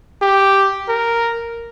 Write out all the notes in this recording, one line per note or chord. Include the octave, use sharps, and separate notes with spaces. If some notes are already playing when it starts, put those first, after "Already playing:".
G4
A#4